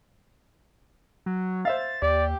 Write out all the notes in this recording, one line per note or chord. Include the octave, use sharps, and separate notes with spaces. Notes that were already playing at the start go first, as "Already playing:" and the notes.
F#3
C5 E5 F5 A6
D#2 G4 D5